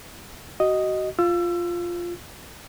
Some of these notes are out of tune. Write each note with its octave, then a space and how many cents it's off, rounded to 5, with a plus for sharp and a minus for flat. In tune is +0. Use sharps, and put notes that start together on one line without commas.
F#4 +25 D#5 +0
F4 +0 E6 +30